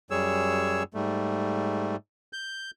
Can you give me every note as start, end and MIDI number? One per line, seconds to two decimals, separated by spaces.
0.11 0.83 42
0.11 0.83 55
0.11 0.83 68
0.11 0.83 73
0.11 0.83 88
0.94 1.96 44
0.94 1.96 55
0.94 1.96 57
2.33 2.71 91